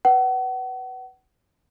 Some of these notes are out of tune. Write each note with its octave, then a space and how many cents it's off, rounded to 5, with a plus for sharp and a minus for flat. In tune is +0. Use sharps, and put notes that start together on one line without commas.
B4 +0 F#5 +35